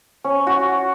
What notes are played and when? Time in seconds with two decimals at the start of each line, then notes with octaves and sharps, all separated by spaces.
0.24 C#4
0.47 F#4